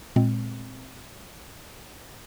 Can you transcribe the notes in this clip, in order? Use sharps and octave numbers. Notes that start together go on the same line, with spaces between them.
A#2 G#3 C4